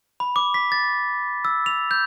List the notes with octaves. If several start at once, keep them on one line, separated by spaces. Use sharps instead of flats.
B5
D6
B6
A6
E6
F7
G6